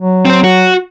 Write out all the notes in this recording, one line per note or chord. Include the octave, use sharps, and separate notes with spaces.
F#3
C4 C5
F#4